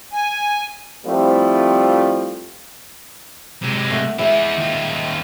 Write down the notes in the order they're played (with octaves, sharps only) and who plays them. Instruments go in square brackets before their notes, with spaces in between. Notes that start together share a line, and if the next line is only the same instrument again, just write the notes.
[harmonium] G#5
[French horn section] F3 G3 A3 C4 E4 F4
[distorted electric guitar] C3 G#3
[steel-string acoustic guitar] A3 F#5
[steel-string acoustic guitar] G#3 E5 [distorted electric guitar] E4 G#4
[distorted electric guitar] D#2 F4